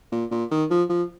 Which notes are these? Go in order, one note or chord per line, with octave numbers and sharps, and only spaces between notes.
A#2
A#2
D#3
F3
F3